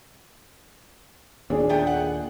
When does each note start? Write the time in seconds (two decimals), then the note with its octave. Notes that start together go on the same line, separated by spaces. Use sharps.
1.50 D#2 A#2 D4 G#4
1.69 A3 B3 G5
1.87 F#5